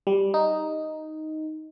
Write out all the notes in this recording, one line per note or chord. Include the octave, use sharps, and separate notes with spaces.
G3
D#4